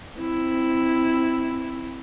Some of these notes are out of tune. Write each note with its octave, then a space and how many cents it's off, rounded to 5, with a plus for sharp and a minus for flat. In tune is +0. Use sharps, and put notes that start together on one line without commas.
C4 +0 E4 +0